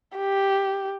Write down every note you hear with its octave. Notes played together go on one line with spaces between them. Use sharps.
G4